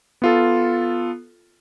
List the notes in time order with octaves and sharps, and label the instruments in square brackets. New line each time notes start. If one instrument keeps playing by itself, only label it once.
[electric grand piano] B3 F4 A4